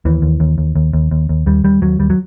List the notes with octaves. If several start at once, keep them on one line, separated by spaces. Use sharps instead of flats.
D#2 E3
D#2
D#2
D#2
D#2
D#2
D#2
D#2
D#2 G3
D#2 G3
D#2 F#3
D#2 G3
F#3